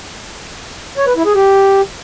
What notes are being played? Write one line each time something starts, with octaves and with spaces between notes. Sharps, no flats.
C#5
B4
E4
G#4
G4